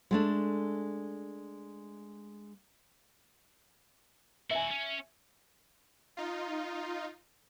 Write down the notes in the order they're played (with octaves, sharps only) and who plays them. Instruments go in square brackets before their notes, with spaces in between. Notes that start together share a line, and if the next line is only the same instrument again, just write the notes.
[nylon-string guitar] G#3 A3 D4
[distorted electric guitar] E4 F#4 [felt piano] E5 G#5
[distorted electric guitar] C#4
[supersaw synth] D#4 F4